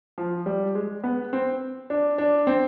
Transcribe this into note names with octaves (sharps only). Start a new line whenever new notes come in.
F3
G3
G#3
B3
C4
D4
D4
C4